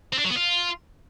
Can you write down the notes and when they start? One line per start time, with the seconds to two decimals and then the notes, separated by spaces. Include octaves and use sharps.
0.13 C4
0.19 D4
0.24 F#3
0.30 B3
0.36 F4